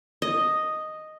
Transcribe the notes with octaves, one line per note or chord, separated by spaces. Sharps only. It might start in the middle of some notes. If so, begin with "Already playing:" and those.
D#5